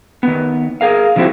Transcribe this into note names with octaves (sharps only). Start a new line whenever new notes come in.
D#3 B3
G#4 A#4 F5
D3 F3 F#3 C4 E4 F#4